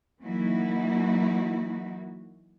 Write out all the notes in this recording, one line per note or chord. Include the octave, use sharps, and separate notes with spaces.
E3 F#3 A#3 D#4 E4 F#4